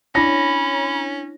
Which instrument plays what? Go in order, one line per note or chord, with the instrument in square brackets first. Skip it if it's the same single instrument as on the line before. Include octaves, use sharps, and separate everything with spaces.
[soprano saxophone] C#4 [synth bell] D4 E4 C#5 [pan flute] B5 [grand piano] A#6